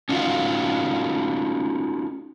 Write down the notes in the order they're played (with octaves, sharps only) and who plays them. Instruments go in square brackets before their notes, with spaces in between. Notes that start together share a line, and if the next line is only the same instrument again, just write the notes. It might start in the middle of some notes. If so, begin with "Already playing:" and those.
[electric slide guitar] C#4 D#4 F4 F#4